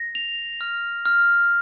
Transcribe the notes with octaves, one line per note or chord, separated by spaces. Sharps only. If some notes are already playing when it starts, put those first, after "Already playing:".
Already playing: A#6
F7
F6
F6